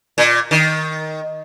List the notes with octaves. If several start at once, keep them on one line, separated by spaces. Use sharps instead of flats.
A#2
D#3